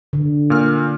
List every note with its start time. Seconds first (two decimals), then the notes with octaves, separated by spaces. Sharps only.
0.13 D3
0.50 A#2 F6